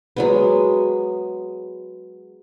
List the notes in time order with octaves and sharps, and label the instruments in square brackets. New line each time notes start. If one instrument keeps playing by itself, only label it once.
[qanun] F#3 G#3 B3